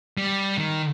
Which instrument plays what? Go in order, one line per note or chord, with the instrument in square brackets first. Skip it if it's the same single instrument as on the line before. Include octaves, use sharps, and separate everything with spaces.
[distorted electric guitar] G3
D#3